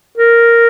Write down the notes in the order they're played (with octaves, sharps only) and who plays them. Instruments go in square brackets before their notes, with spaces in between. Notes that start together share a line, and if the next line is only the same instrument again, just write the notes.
[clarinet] A#4